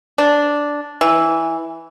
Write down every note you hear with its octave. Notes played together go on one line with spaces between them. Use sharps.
D4
E3